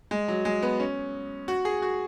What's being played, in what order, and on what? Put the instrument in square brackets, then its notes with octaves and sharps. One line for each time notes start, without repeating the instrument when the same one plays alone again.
[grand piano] G#3
F#3
G#3
B3
C#4
F#4
G#4
F#4